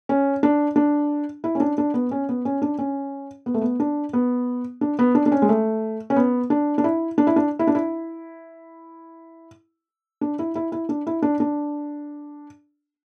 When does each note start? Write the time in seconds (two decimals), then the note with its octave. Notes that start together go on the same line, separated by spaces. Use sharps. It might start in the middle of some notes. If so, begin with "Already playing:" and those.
0.09 C#4
0.43 D4
0.76 D4
1.44 E4
1.55 C#4
1.60 D4
1.78 D4
1.94 B3
2.11 C#4
2.29 B3
2.45 C#4
2.62 D4
2.79 C#4
3.46 B3
3.54 A3
3.61 B3
3.80 D4
4.13 B3
4.81 D4
4.99 B3
5.15 D4
5.26 D4
5.32 C#4
5.42 G#3
5.49 A3
6.10 C#4
6.16 B3
6.50 D4
6.78 D4
6.84 E4
7.18 D4
7.27 E4
7.36 D4
7.59 E4
7.67 D4
7.75 E4
10.21 D4
10.39 E4
10.55 E4
10.72 E4
10.89 D4
11.07 E4
11.22 D4
11.40 D4